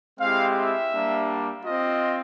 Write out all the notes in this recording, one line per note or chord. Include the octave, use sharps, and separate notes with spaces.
G#3 C4 E4 G4 F5
E5
G3 A#3 D4
C4 F4 D#5